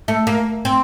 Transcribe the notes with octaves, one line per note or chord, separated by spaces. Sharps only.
A3
A#3
C4